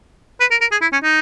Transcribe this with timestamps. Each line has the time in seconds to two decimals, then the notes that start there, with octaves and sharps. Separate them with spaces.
0.40 B4
0.51 A#4
0.61 A#4
0.72 G#4
0.81 E4
0.92 C#4
1.03 D#4